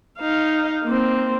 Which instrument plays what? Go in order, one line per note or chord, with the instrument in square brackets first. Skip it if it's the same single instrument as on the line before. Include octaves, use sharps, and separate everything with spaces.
[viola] D#4 F5
A#3 C4